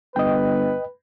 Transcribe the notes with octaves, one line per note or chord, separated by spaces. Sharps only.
G1 B4 D#5 G5